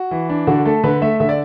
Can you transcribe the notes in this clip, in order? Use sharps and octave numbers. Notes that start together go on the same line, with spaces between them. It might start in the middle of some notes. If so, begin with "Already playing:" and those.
Already playing: F#4
E3
D4
D3 F#4
A3 A4
D3 B4
A3 E5
D3 E5
D5